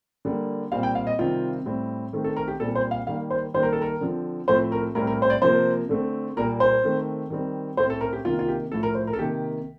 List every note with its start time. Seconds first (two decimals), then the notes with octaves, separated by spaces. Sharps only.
0.25 D3 G3 A#3
0.72 A#2 G3 C4 F5
0.83 G5
0.95 F5
1.07 D#5
1.19 C3 D#3 G3 C4 F4
1.66 A2 G3 C4
2.13 D#3 A3 C4
2.24 A4
2.37 A#4
2.48 G4
2.60 A#2 G3 C4 A4
2.75 C5
2.91 F5
3.07 D#3 G3 A#3 F5
3.30 C5
3.54 D#3 G3 A#3 C5
3.63 A#4
3.73 A4
3.82 A#4
4.01 D3 F3 C4
4.48 A2 F3 A3 C4 C5
4.72 A#4
4.95 A2 G3 C4 A#4
5.07 A#4
5.22 C5
5.30 D5
5.42 C3 F3 A#3 C5
5.89 D3 A3 C4
6.37 A#2 G3 A#3 A#4
6.60 C5
6.83 D#3 A3 C4
7.30 D#3 G3 C4
7.77 A2 A3 C4 C5
7.90 A4
8.01 A#4
8.13 G4
8.25 C3 D#3 A#3 F4
8.39 F4
8.48 G4
8.72 A2 F3 A3 A4
8.83 A#4
8.95 C5
9.07 A#4
9.13 A4
9.19 C3 D#3 A#3 G4